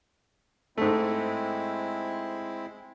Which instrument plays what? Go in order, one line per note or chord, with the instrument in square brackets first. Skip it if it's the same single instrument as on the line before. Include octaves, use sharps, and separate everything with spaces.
[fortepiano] G#2 A3 [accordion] G#3 C4 E4